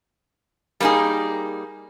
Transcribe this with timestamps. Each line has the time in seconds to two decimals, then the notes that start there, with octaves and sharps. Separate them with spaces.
0.80 G3 A#3 C#4 D#4 G#4